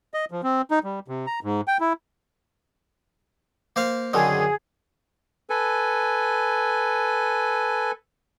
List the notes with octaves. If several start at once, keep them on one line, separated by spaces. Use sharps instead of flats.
D#5
F3
C4
D#4
G3
C3
A#5
G#2
G5
E4
A#3 C5 F5
F#2 D3 D#3 G#4
A4 B4 G#5